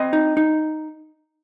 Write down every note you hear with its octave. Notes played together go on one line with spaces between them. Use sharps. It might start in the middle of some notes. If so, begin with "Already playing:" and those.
Already playing: C4 D#5
D#4
D#4